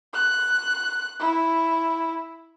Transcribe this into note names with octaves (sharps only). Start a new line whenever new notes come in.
F#6
E4